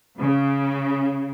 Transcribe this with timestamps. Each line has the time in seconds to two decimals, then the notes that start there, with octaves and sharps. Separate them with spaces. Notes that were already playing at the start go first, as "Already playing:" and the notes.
0.19 C#3